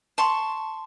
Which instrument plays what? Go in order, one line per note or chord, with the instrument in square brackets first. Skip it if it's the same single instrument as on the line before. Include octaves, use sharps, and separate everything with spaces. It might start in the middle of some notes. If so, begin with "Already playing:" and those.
[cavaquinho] A5 C6 C#6